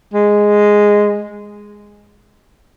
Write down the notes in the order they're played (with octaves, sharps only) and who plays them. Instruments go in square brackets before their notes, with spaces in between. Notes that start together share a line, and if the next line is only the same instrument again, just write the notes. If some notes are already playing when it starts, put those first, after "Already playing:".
[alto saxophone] G#3